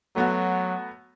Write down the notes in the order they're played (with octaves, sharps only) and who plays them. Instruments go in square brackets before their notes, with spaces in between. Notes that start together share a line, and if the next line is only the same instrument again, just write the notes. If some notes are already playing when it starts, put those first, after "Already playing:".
[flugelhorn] F#3 [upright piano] A3 B3 F#4